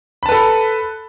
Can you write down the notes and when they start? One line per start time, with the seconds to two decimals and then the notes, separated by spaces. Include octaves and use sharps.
0.23 B5
0.26 A5
0.29 B4
0.32 A4